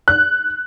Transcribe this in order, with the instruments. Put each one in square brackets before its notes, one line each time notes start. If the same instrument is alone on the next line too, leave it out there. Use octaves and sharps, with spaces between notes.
[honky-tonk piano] F#6